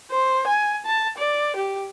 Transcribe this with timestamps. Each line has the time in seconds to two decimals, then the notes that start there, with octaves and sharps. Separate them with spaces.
0.11 C5
0.47 G#5
0.85 A5
1.18 D5
1.56 G4